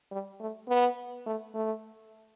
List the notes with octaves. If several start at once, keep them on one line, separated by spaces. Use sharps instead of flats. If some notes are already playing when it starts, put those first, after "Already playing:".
G3
A3
B3
A3
A3